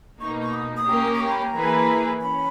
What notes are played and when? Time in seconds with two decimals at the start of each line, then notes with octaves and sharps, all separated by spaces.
0.21 B2 A#3 D#4 C#6
0.42 C#6
0.54 D#6
0.77 D#6
0.87 A#3 C#4 G4 A#4
1.15 D#6
1.20 C#6
1.31 B5
1.42 A#5
1.53 E3 A#3 E4 G#4 B4
2.20 C#4 B5